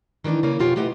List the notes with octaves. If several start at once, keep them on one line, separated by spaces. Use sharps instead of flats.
D#3 E3 A3 D4 D#4
C#3 A#3 C#4
F2 B2 F4 G4 C#5 G#5
A3 E4 G4 B4 D#5 F#5